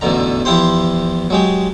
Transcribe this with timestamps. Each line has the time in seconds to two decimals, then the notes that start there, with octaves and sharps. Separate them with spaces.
0.01 A1 E2 B2 D3 A#5
0.45 E2 F3 E4 G4 C5 C6
1.30 F#3 G#3 G4